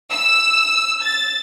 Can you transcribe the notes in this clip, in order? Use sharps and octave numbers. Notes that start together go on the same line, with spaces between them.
E6
A6